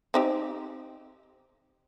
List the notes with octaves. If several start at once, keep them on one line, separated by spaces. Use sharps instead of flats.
C4 D#4 G4